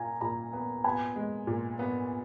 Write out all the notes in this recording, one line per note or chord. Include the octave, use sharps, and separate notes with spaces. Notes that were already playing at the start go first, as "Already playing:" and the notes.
Already playing: A#2 F4 G#5 A#5
A#2 A#5
B3
B3 G#5
G#3
A#2
B3